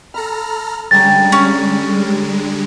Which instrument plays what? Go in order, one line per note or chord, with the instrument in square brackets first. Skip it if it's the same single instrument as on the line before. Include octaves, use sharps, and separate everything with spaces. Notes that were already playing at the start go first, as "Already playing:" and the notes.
[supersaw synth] A4 A#5 F6 [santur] B5
[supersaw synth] D3 G3 G#3 [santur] C#4 G5 A#5 [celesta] A6
[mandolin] C#4 [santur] F5